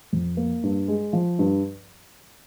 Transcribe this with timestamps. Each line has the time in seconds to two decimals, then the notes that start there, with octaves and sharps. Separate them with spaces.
0.13 F2
0.37 A#3
0.63 G2
0.88 G#3
1.13 F3
1.39 G2